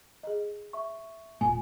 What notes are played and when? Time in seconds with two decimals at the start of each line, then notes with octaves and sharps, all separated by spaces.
0.23 G#4 D#5
0.73 E5 C#6
1.41 D#1 A#2 A3 F4 G#5